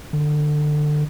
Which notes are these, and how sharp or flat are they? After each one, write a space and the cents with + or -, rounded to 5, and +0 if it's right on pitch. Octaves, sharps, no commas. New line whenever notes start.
D3 +25